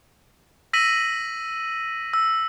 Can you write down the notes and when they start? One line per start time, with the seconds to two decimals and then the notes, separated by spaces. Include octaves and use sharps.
0.73 E6 A#6 B6 D#7 F#7
2.14 E6